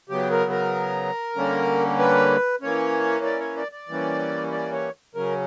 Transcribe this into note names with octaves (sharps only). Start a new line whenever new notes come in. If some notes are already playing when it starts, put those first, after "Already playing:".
C#3 F#3 B3 G4
A#4
A#4
D3 G3 A#3 C#4
B4
E3 A#3 C#4 C#5
D5
C#5
D5
D5
E3 G3 A#3 C#4
D5
C#5
C#3 F#3 C#4 A#4